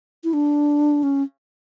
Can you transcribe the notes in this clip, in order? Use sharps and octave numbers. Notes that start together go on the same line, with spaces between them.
E4
D4
C#4